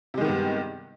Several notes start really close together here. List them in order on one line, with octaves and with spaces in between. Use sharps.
C3 G#3 D#3 B3 G2